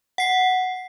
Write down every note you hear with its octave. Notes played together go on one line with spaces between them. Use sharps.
F#5 C7